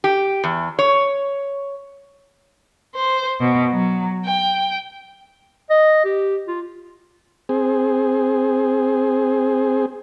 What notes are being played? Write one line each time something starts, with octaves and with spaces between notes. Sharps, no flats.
G4
E2
C#5
C5
B2
F#3
G5
D#5
G4
F4
C4 G#4